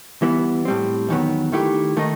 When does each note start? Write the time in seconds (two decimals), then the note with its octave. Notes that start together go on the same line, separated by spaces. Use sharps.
0.22 E3 G3 B3 E4
0.65 A2 G3 C4
1.09 E2 D#3 F#3 B3
1.52 D#3 A3 E4 G4
1.97 D#3 A3 D#4